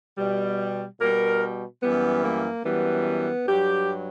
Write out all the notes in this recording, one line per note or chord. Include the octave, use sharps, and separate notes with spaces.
B2 G3
B2 G3 A#4
F#2 E3 G3 B3
A#3
F#2 E3 G3 B3
G2 F#3 G4